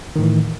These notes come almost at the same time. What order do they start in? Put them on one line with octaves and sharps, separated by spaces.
D#3 A2 E3